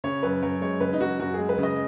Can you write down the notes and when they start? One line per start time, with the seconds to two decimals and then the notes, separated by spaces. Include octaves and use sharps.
0.04 C#3 C#5
0.23 F#2 B4
0.42 F#2 C#5
0.61 G#3 C#5
0.80 C#3 B4
0.93 D#4
1.00 F#2 F#4
1.19 F#2 F#4
1.34 G#3 G#4
1.49 B4
1.58 C#3
1.63 D#5